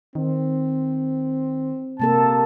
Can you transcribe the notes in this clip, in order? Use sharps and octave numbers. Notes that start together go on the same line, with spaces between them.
D#3 C4
C3 A#3 A4 A5